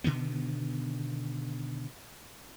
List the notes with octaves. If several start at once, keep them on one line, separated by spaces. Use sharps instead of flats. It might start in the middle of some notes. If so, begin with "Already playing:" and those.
B2 D3 D#3 B3